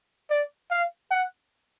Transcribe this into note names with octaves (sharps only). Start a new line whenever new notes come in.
D5
F5
F#5